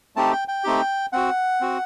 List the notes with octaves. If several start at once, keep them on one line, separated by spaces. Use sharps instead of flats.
A3 C4 D#4 G4 A5
G5
G5
A3 C4 D#4 G4
C4 F#4 F#5
C4 F#4